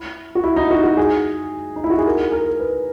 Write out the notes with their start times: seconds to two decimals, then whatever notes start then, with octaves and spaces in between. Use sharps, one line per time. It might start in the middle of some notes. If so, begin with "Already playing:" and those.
Already playing: E4
0.35 F#4
0.44 E4
0.56 D#4
0.71 F#4
0.84 F#4
0.97 G#4
1.76 D#4
1.84 E4
1.90 F#4
1.98 G#4
2.06 A#4
2.19 G#4
2.32 A#4
2.60 B4